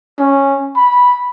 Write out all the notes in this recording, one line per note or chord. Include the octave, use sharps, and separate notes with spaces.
C#4
B5